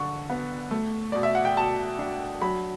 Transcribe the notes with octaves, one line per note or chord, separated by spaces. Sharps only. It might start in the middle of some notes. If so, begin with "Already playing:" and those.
Already playing: D3 D4 C#6
B3
A3
B2 D5
E5
F#5
G5
B2 A5
D4
F#3 B5